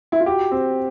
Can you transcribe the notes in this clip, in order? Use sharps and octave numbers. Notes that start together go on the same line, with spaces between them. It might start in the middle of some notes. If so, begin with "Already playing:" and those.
E4
F4
F#4 G4
C4